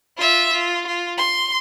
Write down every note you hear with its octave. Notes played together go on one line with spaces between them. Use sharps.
F4 E5
F4
F4
C6